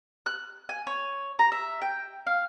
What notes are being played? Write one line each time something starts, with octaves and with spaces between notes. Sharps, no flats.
F#6
G#5
C#5
A#5
E5
G5
F5